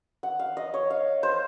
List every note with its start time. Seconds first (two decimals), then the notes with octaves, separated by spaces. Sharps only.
0.23 F#5
0.39 F5
0.57 D#5
0.74 C#5
0.90 F5
1.23 C5